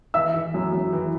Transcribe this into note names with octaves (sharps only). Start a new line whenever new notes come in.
E3 E5 E6
E3
F#2
F#2
E3